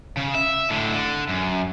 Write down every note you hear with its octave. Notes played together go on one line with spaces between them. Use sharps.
C#3
E5
A2 D3
D3
F#2